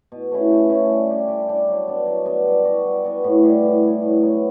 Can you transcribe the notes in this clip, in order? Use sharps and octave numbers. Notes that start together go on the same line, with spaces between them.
B2
A3 C#4 E4
B2
A3 C#4 E4
G3
D4 G4
G3
D4 G4
F#3
B3 D4
F#3
B3 D4
G3
B3 F#4
G3
B3 F#4
A2
G3 B3 E4
A2
G3 B3 E4
A2
F#3 B3